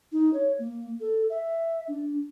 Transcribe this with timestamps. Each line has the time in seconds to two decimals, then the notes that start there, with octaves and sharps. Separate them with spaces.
0.12 D#4
0.34 C#5
0.59 A#3
1.00 A4
1.30 E5
1.88 D4